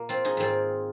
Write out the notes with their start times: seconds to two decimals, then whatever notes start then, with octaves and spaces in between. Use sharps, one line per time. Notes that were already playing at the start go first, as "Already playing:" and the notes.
Already playing: A#2 A#3
0.09 C4 F4
0.25 D#4 G#4
0.37 G#2 D#3 C4 F4